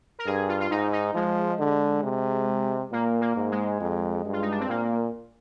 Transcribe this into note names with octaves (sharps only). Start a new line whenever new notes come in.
A#4
G2 G#4
F4
F4
G#2 D#4
D#4
F3 G#3
D3
C3
A#2 A#3
A#3
G#2
G#3
F2
G2
F4
D#4
D4
C4
A#2 A#3